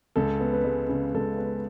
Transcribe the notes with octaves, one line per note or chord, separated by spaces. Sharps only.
C#2 A4
B3
B4
G#3
C#3
C#2 A4
B3 B4